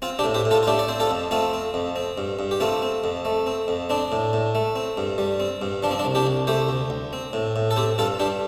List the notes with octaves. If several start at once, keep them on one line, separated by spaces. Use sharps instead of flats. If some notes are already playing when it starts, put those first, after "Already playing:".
C4 F4
D4 G4
A2
G4 C5
A2
F4 A4
F4
A3 D4 G4
D5
C4 C5
F4 A4
F2
A3 C4 F4
C4
F2
C4
G2
G2
G4
A3 C4 F4
C4
F2
A3
C4
F2
C4 D4
A2
A2
A3
C4
G2
G3
C4
G2
F3 D4
C4
D4
C2
D4 G4
C2
A3 G4 C5
D2
D2
C4
A2
A2
A4
C4 G4 C5
G2 F4 A4
G2 D4 G4